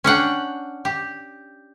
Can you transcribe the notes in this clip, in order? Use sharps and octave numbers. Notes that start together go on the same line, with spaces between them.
C#4 D4 F#5 G5
G4